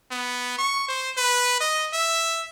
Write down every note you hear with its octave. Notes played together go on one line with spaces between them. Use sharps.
B3
C#6
C5
B4
D#5
E5